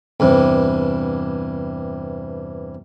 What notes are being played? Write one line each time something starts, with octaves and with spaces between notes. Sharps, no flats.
E2 G2 C3